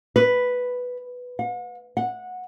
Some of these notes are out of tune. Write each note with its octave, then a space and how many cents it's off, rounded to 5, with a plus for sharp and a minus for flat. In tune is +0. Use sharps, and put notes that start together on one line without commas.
B4 +0
F#5 -45
F#5 -20